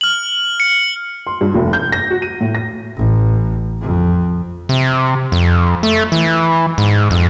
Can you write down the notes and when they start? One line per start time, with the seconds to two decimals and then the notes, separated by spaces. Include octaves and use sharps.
0.01 F6 F#7
0.60 C#7
1.27 C6
1.41 G2
1.55 F1
1.73 G6
1.92 A#6
2.10 F#4
2.22 D#7
2.41 A2
2.55 A#6
2.97 A1
3.81 F2
4.69 C3
5.32 F2
5.83 A3
6.12 E3
6.78 G#2
7.11 F2